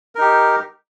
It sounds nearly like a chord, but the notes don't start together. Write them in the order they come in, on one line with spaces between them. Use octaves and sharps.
A#4 D#4 G4